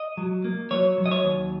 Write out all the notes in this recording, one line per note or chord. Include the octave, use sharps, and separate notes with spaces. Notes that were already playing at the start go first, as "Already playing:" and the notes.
Already playing: D#5
F#3
A#3
F#3 C#5
F#3
D#5
C#5
D#2